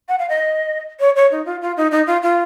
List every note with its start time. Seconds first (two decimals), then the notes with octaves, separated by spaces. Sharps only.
0.09 F#5
0.19 F5
0.29 D#5
1.00 C#5
1.16 C#5
1.31 D#4
1.46 F4
1.61 F4
1.77 D#4
1.91 D#4
2.07 F4
2.23 F4